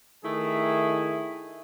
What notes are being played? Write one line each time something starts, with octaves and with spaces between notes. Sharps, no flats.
D#3 A3 E4 G#4